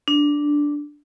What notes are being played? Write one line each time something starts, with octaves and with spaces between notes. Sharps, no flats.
D4